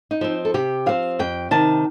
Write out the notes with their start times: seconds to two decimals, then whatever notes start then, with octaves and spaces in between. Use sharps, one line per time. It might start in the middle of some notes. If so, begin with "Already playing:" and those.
0.11 D#4
0.21 F3 C4
0.45 A4
0.54 C3 G4
0.86 F3 C4 F5
1.19 F2 G5
1.51 C3 D#3 A5